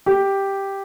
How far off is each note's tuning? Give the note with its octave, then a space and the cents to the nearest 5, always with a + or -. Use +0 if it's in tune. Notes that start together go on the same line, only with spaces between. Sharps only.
G4 +0